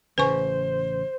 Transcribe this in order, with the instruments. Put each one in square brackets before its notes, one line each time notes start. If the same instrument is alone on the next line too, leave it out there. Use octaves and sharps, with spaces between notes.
[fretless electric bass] A1 C#3 [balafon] B4 G#5 C#6 [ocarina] C5